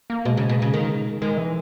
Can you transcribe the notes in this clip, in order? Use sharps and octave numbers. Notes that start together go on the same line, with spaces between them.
A#3
B2 G#3
C#3
B2
C#3
D#3
D#3 G#3
E3